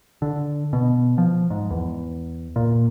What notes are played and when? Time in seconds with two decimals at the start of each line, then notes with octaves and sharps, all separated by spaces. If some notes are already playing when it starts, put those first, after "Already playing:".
0.22 D3
0.73 B2
1.18 F3
1.50 G#2
1.71 E2
2.56 A#2